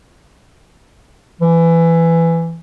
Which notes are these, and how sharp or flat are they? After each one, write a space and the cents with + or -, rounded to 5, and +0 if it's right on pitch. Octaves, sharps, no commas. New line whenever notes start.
E3 +15